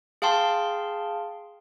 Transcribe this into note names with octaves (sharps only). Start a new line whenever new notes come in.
G#4 F5 G5 A5 C6